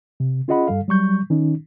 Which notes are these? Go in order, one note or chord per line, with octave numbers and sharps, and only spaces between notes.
C3
C#4 F4 G#4 D#5 F#5 B5
G2 G3 A4 F5
F#3 G3 C#6 G6
D#3 C#4 D#4